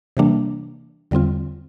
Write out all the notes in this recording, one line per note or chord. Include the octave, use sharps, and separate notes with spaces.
C3 E3 G3 A#3 D4
E2 D3 G3 C4 F4